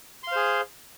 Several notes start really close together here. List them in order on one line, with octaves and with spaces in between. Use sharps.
C6 F5 C5 G#4